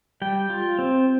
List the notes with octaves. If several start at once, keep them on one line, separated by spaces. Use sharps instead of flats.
G3 G5
F4
C4